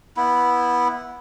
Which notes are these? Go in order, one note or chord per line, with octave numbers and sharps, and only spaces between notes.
B3 E4